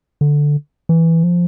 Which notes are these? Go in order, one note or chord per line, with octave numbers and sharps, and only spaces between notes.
D3
E3
F3